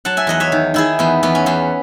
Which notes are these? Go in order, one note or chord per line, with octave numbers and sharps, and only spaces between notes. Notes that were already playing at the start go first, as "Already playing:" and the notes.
F#3 F#5 A5
E5 G#5
E2 D#5 F#5
C#5 E5
D#3
D#3 E4 G#4
E2 B3
E2 B3
C#4
E2 B3